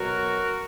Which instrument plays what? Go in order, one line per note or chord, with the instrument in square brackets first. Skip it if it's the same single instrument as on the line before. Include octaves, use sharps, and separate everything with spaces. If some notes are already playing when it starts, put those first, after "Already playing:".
Already playing: [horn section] B2 F#3 F#4 A#4